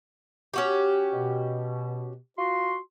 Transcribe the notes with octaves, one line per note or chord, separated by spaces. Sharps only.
C#4 F#4 G4
B2
F4 F#4 C6